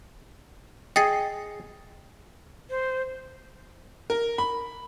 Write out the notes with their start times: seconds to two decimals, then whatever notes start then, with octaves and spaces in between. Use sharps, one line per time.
0.96 G#4 D#5 G5 A6 C7
2.70 C5
4.10 A#4
4.38 B5